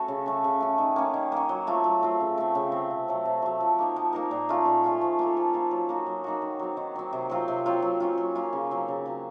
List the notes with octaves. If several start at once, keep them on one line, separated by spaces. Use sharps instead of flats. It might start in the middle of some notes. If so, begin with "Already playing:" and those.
Already playing: A3 C#4 F#4 A4
C#3
A3 C#4
C#3
A3 C#4
D#3
A#3 C#4
D#3
A#3 C#4
F#3
A3 C4 F4
F#3
A3 C4 F4
C#3
A3 C4
C#3
A3 C4
C3
F#3 A3
C3
F#3 A3
F3
A#3 D#4 A#4
F3
A#3 D#4 A#4
A#2
A3 C#4 F4
A#2
A3 C#4 F4
F3
A#3 F4 A4
F3
A#3 F4 A4
F#3
A#3 D#4 F#4
F#3
A#3 D#4 F#4
D#3
F#3 C4
D#3
F#3 C4
C3
F#3 C4 F4
C3
F#3 C4 F4
F#3
A#3 C#4 F4
F#3
A#3 C#4 F4
C#3
F#3 C4
C#3
F#3 C4